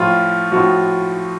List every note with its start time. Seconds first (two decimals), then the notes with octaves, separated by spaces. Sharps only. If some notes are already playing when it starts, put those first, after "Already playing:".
Already playing: A2 F3 F4
0.52 A2 F3 F#4